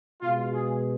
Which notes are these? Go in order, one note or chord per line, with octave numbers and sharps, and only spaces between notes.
B2 G#3 F4
G#4